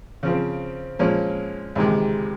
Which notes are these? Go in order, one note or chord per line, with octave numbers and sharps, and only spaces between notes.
C#3 F3 C4
A#2 F3 G#3 C#4
C#2 C3 D#3 G#3